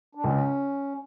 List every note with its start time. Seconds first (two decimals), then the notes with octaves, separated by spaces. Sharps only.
0.15 D4
0.24 C#2 C#4